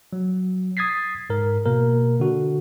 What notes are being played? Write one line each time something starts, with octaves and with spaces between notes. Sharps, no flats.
F#3
D#6 G#6 A6 B6 C7
G#2 A#4
B2 A#3 A#4
D3 F#4